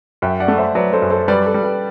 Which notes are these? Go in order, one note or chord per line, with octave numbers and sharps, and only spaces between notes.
F#2 E5 G5
D5 F#5
A3
C5 E5
F#3 B4 D5
A4 C5
F#2
A4 C5
G3 B4 D5
A4
G3
G4 B4